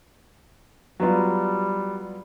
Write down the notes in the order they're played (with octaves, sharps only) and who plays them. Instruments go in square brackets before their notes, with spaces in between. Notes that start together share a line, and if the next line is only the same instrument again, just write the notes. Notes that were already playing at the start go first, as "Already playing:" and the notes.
[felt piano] F#3 B3 F4 [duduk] G3